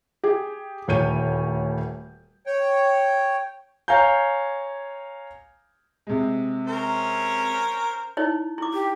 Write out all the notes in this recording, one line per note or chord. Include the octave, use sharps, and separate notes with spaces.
G4 G#4
D#1 D2 C#5 G6 D#7
C#5 G5
C#5 F5 G#5 A#5 G6
C3 G#3
C#4 A#4 C5
D#4 E4 C#5
E4 D6
G4